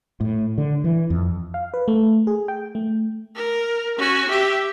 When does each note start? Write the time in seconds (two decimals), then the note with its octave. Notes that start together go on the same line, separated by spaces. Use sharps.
0.20 A2
0.58 D3
0.84 E3
1.10 F2
1.54 F5
1.74 B4
1.88 A3
2.27 G#4
2.48 G5
2.75 A3
3.35 A#4
3.98 C#4 F#4
4.29 G4 E5